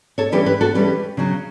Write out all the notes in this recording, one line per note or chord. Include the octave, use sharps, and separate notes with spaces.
A4 C#5
E3 G3 C#4 G4 B4
G4 B4
F#4 A4
E3 G3 C#4 G4 B4
C#3 F#3 C#4